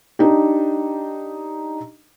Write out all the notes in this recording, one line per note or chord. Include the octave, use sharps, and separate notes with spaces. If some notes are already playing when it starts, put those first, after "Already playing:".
D4 D#4 G4